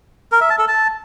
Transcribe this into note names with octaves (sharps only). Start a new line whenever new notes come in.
A#4
E5
A5
A4
A5